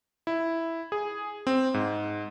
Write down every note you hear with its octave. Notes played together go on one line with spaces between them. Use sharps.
E4
G#4
C4
G#2